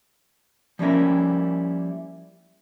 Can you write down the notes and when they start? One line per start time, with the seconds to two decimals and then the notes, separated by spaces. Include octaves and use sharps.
0.79 F3 G3 A#3 C#4 E4 A#4